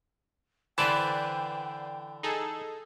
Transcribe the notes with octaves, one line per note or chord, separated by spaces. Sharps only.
D3 E3 B4 C5 D5 G5 A5
D#4 G#4 A4